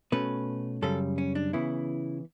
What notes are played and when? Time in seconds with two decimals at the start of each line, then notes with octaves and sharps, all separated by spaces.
0.12 B2 A3 C#4 B4
0.82 F#2 C#3 G3 A4
1.18 C#4
1.35 D4
1.53 C#3 E3 B3 E4